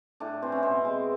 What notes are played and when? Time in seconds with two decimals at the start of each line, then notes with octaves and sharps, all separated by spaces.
0.20 A2 D4
0.42 E3 C4
0.52 C#4
0.63 B2 C4
0.85 G#3